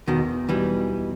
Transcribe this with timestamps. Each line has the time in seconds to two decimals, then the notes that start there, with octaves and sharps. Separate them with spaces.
0.07 E2 B2 D#3
0.48 B2 E3 F#3 G3 B3 D#4
0.88 E2